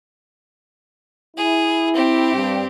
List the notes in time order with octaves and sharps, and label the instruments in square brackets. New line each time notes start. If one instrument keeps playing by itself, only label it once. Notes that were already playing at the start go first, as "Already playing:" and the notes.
[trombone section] E4 [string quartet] G#4
[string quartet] C4 G4
[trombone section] G2